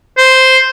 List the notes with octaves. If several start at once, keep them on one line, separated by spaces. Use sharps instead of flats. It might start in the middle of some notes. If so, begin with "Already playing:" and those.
C5